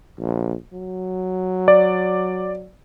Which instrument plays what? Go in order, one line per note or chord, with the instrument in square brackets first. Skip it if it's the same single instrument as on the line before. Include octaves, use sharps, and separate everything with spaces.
[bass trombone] A#1
F#3
[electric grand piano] D5